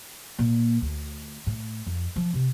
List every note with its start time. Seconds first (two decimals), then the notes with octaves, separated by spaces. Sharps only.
0.39 A#2
0.82 D2
1.47 A2
1.86 F2
2.16 F3
2.33 C3